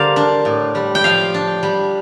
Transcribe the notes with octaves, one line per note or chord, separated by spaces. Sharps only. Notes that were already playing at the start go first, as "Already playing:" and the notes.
Already playing: D3 G3 A#4 C5 D5 F5
D4
A2
G3
G5
F3 F5
D4
G3